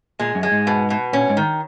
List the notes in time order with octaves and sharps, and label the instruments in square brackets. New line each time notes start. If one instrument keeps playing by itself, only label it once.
[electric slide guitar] A#2 [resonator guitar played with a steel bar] G#3
[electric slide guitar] F#2
[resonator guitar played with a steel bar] G#3
[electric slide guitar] G#2
[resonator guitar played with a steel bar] B2
B2
[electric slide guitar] A#2 [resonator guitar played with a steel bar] C#4
[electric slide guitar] G#2
[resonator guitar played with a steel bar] D#3